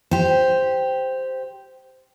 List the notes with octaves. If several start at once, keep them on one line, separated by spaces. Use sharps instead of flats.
G4 C5